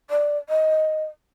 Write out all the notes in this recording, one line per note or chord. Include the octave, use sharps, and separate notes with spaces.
D5
D#5